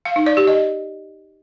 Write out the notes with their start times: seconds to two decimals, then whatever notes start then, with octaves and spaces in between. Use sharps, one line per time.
0.05 F5
0.16 D#4
0.26 D5
0.37 G4
0.47 D#5